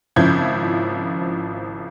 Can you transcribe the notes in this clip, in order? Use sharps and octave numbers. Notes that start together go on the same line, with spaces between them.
G#1 C#3 F3 E4 G6 G#6